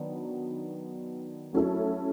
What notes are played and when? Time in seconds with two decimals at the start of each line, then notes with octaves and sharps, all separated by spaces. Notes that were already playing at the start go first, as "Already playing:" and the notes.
Already playing: D#3 F#3 B3 D4
1.53 F#3 A3 C#4 E4 A4